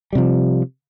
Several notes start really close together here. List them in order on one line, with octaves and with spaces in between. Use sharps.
G3 C3 F3